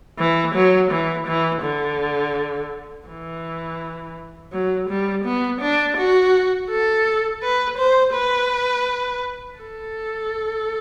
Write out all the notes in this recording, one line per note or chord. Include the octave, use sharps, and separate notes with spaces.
E3
F#3
E3
E3
D3
E3
F#3
G3
B3
D4
F#4
A4
B4
C5
B4
A4